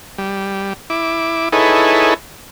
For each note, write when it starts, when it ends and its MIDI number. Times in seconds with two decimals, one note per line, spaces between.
0.18 0.73 55
0.90 1.49 64
0.90 1.49 86
1.52 2.14 63
1.52 2.14 64
1.52 2.14 68
1.52 2.14 69
1.52 2.14 71
1.52 2.14 73